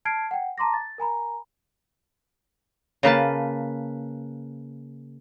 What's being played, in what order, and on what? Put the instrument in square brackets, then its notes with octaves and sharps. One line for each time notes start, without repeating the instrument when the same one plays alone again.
[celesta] A5 F6 G#6 C7 D7
F#5 G5
A5 A#5 C6 D6 A#6
A6
A#4 G#5 A#5 B5
[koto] C#3 A#3 B4 A5